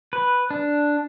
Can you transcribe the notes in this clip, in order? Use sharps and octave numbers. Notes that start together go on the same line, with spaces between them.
B4
D4